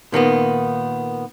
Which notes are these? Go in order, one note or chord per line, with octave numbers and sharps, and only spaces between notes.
A#2 D#3 A#3 B3